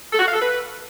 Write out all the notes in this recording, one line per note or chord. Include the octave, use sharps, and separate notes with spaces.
A4
F#4
F5
A4
B4